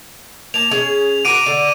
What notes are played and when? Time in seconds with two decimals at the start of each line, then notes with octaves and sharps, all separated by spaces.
0.54 A#3 A5 F7
0.71 C#4 G#4
1.25 F#4 A#4 D6 D7 D#7
1.46 D3